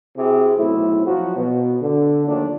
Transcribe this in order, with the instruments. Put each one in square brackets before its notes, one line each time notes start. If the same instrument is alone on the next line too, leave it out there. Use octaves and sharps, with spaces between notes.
[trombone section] C3 E4 F#4 G#4
B1 A2 A3 C4 E4
F3 F#3 F#4
B2
D3
D#2 D3 F3 F#3 A3 D4